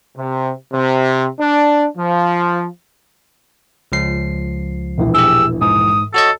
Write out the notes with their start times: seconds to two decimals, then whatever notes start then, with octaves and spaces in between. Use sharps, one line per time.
0.16 C3
0.71 C3
1.39 D4
1.97 F3
3.92 C#2 F3 C7
4.98 E1 A#1 E3
5.15 G4 G#4 E6
5.61 G#2 D#6
6.14 F#4 A4 C#5 D#5